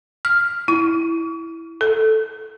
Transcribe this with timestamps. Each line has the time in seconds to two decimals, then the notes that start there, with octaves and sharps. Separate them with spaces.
0.25 F6
0.68 E4
1.81 A4